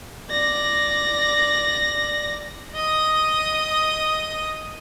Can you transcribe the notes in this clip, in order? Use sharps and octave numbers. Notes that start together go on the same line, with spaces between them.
D5 A#6
D#5 D#6